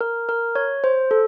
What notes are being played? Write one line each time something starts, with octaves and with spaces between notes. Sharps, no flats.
A#4
A#4
C#5
C5
A4